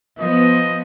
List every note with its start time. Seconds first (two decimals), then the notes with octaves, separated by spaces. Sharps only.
0.19 F3 B3 D#5